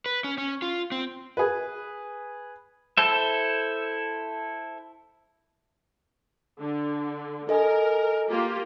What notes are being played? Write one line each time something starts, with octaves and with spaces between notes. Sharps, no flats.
B4
C#4
C#4
F4
C4
G#4 B4
E4 A4 C5 E5
D3
A4 A#4 D#5 G#5
A#3 F4 G4